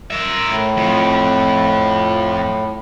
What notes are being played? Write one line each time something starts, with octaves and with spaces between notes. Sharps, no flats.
A#4 E5
A2
F2